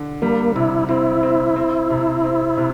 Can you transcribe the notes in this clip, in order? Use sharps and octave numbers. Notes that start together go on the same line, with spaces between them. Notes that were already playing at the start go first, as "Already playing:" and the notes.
Already playing: D3
G3 A#3
C3 E4
C4 E4
C4
C4
C3
C4
C3